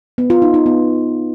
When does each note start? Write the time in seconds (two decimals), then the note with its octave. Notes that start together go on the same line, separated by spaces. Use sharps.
0.18 B3
0.30 F4
0.42 D#4
0.54 D#4
0.66 B3